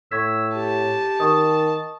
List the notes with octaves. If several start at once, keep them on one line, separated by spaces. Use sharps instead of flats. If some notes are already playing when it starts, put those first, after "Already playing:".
A2 C#6 E6 G#6 B6
G4 A5
D#3 C#6 D#6